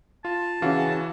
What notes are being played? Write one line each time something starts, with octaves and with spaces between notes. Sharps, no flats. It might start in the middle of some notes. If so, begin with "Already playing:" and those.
F4 A5
C#3 E3 C#4 F#4 F5